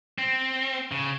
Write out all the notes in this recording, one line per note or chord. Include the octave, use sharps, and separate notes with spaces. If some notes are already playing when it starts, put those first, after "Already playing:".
C4
C#3